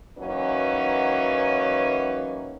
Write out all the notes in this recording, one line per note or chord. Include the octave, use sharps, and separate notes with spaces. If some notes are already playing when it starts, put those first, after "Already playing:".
E3 F#3 A#3 C#4 D#4 B4